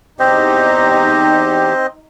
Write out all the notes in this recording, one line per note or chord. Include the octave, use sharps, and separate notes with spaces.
E2 C4 D#4 G4 C5 D#5